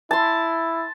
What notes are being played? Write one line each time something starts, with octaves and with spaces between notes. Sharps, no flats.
E4 A5 C6